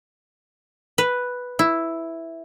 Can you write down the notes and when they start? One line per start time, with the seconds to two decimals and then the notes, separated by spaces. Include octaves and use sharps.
0.98 B4
1.59 E4